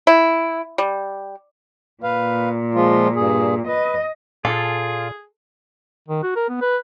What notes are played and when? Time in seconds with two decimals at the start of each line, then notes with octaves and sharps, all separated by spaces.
0.07 E4
0.78 G3
2.03 A#2 B4 F5
2.75 F3 G#3 F4
3.16 G2 G#4
3.68 B4 D#5
4.45 A#2 F4 G#4 A4
6.08 D#3
6.23 F#4
6.36 A#4
6.49 B3
6.61 B4